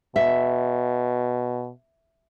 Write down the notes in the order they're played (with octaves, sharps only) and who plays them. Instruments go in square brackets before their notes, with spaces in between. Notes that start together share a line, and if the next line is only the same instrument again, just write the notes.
[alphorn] B2 [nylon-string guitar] E5